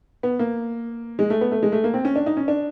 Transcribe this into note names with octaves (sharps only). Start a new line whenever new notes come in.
B3
A#3
G#3
A3
B3
A3
G#3
A3
A#3
C4
C#4
D4
D#4
C#4
D4